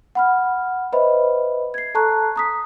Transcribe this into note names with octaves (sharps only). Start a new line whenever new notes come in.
F#5 B5 F6
B4 C5 D#5 E5 B5
G#6 C7
A4 A5 A#5 C#6 F#6
A#5 D#6 B6